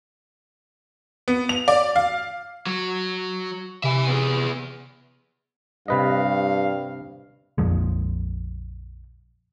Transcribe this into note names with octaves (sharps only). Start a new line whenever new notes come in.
B3
F7
D5
F5
F#3
C3 E5 G#5
B3 G#4
G2 C3 B4 D#5 F5
A#1 F2 F3 G#3